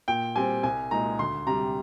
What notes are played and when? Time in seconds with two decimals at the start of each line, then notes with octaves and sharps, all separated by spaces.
0.08 A#2 G5
0.36 G3 C4 G#5
0.63 C2 G#5
0.91 A#2 G#3 D#4 A#5
1.19 D2 C6
1.47 C3 G3 A#5